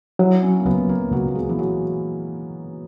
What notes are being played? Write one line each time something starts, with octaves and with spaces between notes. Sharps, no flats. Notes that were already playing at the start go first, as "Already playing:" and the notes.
F#3 E4
C#4
A#3
C#2 B3
A#3
C#2 F#3
A#3
G#3
E3
F#3